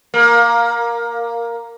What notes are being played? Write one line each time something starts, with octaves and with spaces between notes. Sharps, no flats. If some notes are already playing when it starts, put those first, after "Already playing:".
A#3